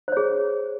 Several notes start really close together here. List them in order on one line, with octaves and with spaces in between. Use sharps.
C5 C#5 G#4